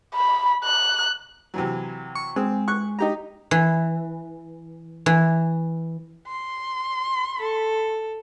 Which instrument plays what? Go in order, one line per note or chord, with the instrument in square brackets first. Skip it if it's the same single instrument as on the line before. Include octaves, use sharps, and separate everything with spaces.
[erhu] B5
F#6
[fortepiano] C3 E3 F#3
[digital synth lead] C#6
[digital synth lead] G#3 [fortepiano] C4
[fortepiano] C#6 F#6
D#4 G4 A#5
[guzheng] E3
E3
[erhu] C6
[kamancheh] A4